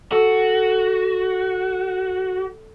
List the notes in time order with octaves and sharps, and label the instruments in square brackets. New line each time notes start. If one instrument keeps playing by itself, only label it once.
[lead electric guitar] F#4 [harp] A4